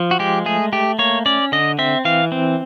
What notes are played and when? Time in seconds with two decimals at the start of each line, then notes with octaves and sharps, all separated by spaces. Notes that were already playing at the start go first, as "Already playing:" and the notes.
Already playing: F3
0.11 F#4
0.19 G#3 G4
0.46 A3 G#4
0.72 A3 G4
0.99 A#3 C#5
1.26 C#4 D5
1.52 D3 D#5
1.79 C4 E5
2.05 E3 F5
2.32 C4